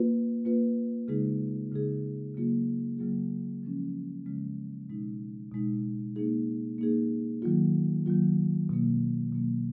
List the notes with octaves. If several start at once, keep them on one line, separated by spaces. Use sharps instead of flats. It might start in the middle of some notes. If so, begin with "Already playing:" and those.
Already playing: A#3 F4 B4
A#3 F4 B4
C#3 G#3 D#4 G#4
C#3 G#3 D#4 G#4
C#3 F#3 A#3 F4 G#4
C#3 F#3 A#3 F4 G#4
C#3 F3 G#3 C#4
C#3 F3 G#3 C#4
B2 G#3 D#4
B2 G#3 D#4
A#3 D#4 G#4
A#3 D#4 G#4
D#3 F#3 A#3 F4
D#3 F#3 A#3 F4
B2 F#3 A#3
B2 F#3 A#3